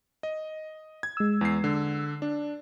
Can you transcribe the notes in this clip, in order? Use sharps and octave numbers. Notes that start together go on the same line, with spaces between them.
D#5
G#6
G#3 E6
E2 C7
D3
D4